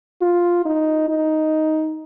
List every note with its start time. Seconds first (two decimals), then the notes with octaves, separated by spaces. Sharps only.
0.22 F4
0.65 D#4
1.09 D#4